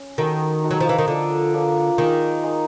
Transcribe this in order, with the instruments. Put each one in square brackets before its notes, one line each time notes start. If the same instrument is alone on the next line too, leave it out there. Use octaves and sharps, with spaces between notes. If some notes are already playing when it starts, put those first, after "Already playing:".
Already playing: [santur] C#4
[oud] D#3 [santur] D#4 F#4 A4
[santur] D#4 F#4 A4
[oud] F#3
F3
E3
D#3
[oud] D3 [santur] F3 A#3 D4 F4
[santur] F3 A#3 D4 F4
[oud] D#3 [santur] D#4 G#4 C5
[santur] D#4 G#4 C5